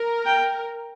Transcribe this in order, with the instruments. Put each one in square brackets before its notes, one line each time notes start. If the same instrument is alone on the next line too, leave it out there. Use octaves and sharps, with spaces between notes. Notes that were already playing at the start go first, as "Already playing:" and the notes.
Already playing: [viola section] A#4
[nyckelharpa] G5